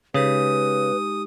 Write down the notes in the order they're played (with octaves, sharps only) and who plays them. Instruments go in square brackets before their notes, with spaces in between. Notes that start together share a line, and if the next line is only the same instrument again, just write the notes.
[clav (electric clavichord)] C#3 [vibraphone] G#3 D#4 G4 [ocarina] B4 [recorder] D#6